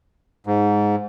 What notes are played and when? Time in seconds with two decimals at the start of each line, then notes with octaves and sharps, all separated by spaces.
0.47 G#2